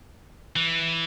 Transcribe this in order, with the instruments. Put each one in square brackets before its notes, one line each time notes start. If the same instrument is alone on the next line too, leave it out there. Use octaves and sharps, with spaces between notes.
[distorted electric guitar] E3